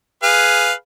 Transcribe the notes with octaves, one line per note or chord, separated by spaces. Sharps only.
G#4 B4 F5